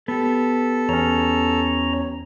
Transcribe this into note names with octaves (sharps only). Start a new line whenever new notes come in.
B3 G4 A4
E2 C#4 C#5 A#5